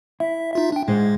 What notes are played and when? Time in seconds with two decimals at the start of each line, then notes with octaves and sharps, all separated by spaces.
0.20 E4 E5
0.53 D#4 F4 E5
0.72 D4 G5
0.88 A2 G#3 G#4 C5